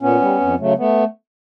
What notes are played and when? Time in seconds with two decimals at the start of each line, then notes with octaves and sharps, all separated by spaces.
0.01 A#2 B3 C#4
0.21 G3
0.41 F2
0.59 C#3 F#3 A3
0.77 A3 B3